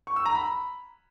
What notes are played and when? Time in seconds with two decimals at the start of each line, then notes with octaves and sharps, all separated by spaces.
0.07 C#6
0.16 E6
0.26 A#5
0.35 B5